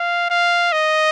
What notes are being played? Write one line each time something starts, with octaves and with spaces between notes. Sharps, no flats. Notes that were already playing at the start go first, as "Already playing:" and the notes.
Already playing: F5
F5
D#5